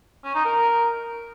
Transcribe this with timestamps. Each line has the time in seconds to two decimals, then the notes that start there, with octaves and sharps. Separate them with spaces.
0.24 C#4
0.34 D#4
0.45 A#4